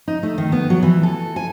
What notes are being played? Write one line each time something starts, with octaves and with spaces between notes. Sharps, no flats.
D#4
A3
D#3
B3
F#3
E3
A4
G#5